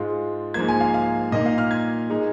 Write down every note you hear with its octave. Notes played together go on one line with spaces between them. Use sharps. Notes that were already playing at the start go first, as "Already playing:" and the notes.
Already playing: G#2 G#3 F4
G#2 F3 A#3 G#6
G#5
F5
F5
A#2 A#3 D#4 D#5
F5
F6
G#6
G#3 D#4